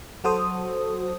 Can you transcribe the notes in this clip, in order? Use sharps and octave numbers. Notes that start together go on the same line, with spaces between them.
F#3 F#4 A4 C5 D#6